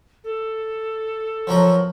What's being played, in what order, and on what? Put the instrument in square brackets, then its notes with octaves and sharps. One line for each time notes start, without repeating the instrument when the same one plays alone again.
[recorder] A4
[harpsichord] F3 F#3 A#4